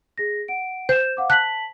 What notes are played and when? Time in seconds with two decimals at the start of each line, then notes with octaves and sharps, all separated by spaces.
0.18 G#4 A#6
0.48 F#5 D7
0.89 C5 G6 E7
1.17 F5 F#5 D6
1.30 A5 F#6 B6 F#7